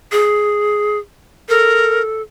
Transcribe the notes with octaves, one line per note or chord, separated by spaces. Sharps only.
G#4
A4 A#4